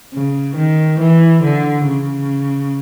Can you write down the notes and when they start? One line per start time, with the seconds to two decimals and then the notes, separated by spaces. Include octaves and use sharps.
0.13 C#3
0.56 D#3
1.00 E3
1.43 D3
1.87 C#3